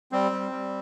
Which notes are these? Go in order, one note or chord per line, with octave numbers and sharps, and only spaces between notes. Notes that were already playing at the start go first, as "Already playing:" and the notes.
G3 C4
G3
G3